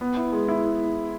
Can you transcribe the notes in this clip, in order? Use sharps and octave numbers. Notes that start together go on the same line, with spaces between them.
B3
E4
G#3
E4